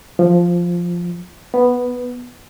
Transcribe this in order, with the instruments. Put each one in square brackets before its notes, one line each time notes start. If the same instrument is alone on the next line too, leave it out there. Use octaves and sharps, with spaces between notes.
[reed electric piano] F3
B3